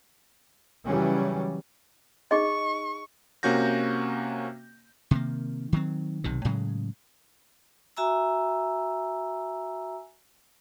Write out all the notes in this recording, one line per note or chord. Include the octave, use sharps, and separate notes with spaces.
C#3 E3 F#3 G3 C#4
D#4 G#4 D#5 C#6
C3 A#3 C#4 F#4 G6 A#6
C3 D#3 A#3
D#3 F#3 C4
B1 C3 D#3
A2 C#3 F#3 G#3
F#4 E5 G#5 A#5 E6